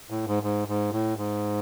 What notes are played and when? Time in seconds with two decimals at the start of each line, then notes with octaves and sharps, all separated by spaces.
0.10 A2
0.27 G#2
0.43 G#2
0.68 G#2
0.92 A2
1.17 G#2